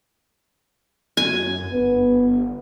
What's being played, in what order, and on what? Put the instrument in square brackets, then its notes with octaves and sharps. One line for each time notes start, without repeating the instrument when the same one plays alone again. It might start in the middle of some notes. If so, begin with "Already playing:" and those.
[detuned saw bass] F#2 [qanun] G#5
[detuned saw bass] G1 [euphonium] B3